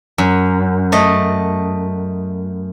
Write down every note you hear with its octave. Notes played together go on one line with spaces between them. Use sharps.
F#2
A3 D#5